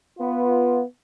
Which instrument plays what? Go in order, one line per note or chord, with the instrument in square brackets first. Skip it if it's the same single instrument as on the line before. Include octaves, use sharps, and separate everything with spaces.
[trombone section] B3 F4